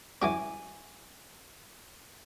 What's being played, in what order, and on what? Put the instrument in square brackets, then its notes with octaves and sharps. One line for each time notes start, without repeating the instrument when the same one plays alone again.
[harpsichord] E3 F#3 C#4 [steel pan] G#5 D6